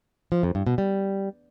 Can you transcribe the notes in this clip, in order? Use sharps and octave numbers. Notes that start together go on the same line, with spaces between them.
F3
F2
G2
B2
G3